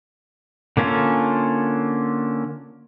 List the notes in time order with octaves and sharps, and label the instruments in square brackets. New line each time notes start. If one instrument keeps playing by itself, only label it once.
[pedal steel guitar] D3 A#3 C#4 F4 A4